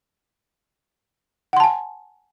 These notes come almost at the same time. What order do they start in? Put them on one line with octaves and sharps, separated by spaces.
F#5 C6 A5 G#5